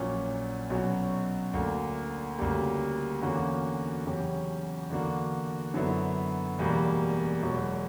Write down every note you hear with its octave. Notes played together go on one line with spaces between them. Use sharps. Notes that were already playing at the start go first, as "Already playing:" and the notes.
Already playing: A#1 A#2 F#3 C#4
B1 B2 F#3 C#4
D2 D3 A#3
D2 C#3 G3 A#3
E2 D3 A#3 C#4 F#4
E2 C#3 F#3 C#4 G4
E2 D3 A#3 D4 F#4
F#2 D3 F#3 B3 E4
E1 E2 B2 G3 A#3
E1 E2 B2 F#3